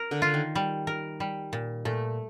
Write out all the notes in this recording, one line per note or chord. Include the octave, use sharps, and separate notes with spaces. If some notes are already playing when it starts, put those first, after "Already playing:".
Already playing: A#4
D3
D3 F4
D#3
G3
A#4
G3
A#2
A#2 A3